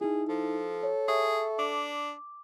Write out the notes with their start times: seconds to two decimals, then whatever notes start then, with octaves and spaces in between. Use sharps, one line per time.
0.01 D#4 E4 G#4
0.29 F3 A4
0.83 C#5
1.08 G#4 E5 C#6
1.59 D4 D6